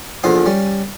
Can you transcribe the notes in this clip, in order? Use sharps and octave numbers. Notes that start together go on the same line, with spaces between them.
A#1 E2 D3 F3 C5 D#6
G3 C#4